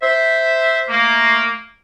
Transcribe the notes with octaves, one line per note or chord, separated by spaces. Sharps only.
C5 E5
A3 A#3